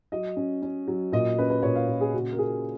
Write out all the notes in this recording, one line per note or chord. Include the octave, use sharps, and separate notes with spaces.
F#3 D#5
C#4
C#4
F#3
A#2 D#5
C#4 B4
B4
A#2 C#5
F5
A#2
G#4
C#3 F#4
A#4
F4 G#4